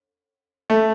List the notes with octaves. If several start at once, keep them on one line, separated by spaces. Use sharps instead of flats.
A3